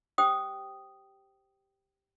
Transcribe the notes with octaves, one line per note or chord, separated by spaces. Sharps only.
G4 C5 G5 D#6